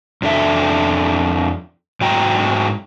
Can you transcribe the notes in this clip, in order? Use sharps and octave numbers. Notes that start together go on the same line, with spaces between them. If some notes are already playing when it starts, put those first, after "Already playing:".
F2 D4 A4 E5
G#2 F#3 G5 A#5